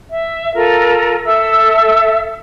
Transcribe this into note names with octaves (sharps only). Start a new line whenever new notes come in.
E5
F4 A4 A#4
A4 E5 E6